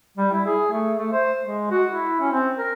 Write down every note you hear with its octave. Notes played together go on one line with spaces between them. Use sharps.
G3
E4
G#4
A3
A3
C5
G#3
F#4
E4
C#4
C4
A#4